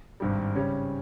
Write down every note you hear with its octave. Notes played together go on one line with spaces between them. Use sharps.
G#1 G2 G3
C#3 G3 C#4